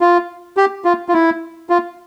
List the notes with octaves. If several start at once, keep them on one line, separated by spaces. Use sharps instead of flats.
F4
G4
F4
F4
E4
F4